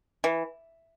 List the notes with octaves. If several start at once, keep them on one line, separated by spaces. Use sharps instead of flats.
E3